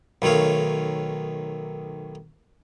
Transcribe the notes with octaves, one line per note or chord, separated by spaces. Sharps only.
B1 D#3 A3 C#5 F5